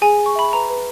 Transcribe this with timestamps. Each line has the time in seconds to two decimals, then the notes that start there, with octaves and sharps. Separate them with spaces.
0.02 G#4 G#5
0.19 G#4
0.26 C#6
0.35 E5 B5
0.53 B4 A#5
0.70 B4